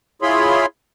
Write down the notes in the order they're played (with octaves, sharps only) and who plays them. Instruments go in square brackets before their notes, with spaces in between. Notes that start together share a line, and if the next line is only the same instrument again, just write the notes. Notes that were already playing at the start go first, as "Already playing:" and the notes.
[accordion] E4 F4 G#4 C#5 B5 C6